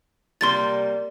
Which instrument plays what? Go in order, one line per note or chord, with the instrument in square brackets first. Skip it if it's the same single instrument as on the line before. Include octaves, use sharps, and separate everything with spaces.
[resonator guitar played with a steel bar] C3 G3 A#3 [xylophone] C6 A6